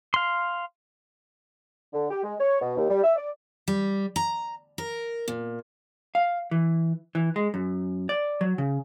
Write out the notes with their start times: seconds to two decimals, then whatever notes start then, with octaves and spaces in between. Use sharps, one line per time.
0.14 F5 C6
1.94 D3
2.11 G4
2.24 G#3
2.40 C#5
2.62 B2
2.77 D#2
2.90 G3
3.04 E5
3.16 D5
3.68 G3
4.16 A#5
4.78 A#4
5.28 A#2
6.15 F5
6.51 E3
7.15 E3
7.36 G#3
7.54 F#2
8.09 D5
8.41 F#3
8.58 C#3